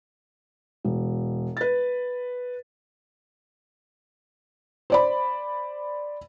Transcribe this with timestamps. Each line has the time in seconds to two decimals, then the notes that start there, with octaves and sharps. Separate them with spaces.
0.85 E1
1.57 B4 A6
4.90 C5 D5 B5